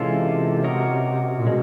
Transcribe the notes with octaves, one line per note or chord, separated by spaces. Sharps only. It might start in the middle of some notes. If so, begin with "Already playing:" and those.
Already playing: C3 E3 G#3 C#4 F4 A4
C#4 F#4 A#4 D#5
A#2
B2 G#3